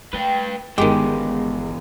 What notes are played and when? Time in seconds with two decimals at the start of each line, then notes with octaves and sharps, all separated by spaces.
0.13 A3 B4 G5
0.78 G1 E2 B2 D#3 G#3 G4 G5